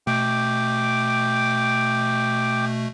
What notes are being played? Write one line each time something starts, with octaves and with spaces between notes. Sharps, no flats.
B2 A3 G5 D6